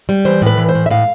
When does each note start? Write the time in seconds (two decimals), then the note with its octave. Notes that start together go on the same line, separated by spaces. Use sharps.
0.09 G3
0.25 E3 C5
0.42 A2 B4
0.58 E3
0.69 C5
0.75 A2
0.86 E5
0.90 A2 F5